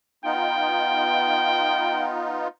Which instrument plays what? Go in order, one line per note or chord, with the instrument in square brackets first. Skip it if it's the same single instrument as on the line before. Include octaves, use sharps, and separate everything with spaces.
[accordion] B3 D#4 F4 [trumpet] G5